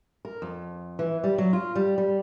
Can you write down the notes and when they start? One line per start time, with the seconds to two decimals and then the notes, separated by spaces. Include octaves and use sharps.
0.25 A#4
0.42 F2
0.99 E3
1.24 G3
1.38 F#3
1.53 F4
1.75 G3
1.98 G3